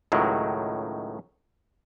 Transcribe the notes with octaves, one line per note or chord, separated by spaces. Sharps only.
C#2 A2 D#3 F#3